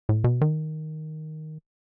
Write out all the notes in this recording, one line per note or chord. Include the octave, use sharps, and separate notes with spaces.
A2
B2
D#3